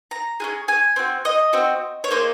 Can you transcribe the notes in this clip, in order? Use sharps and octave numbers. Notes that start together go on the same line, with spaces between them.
A#5
C#4 F4 G#4
G#5
C4 F#4
D#5
C4 F#4
C#5
A#3 D#4 G#4 C5